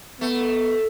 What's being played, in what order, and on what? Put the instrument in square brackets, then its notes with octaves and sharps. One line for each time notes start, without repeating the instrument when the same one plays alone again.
[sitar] A3 [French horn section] B3